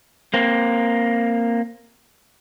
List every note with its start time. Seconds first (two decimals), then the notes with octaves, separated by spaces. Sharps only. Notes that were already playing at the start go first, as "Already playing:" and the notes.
0.34 A#3 C4